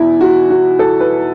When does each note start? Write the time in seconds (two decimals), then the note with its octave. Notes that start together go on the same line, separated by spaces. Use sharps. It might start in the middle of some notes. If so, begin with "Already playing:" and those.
Already playing: E2 B2 E4
0.21 F#4
0.50 F#4
0.79 A4
1.00 B4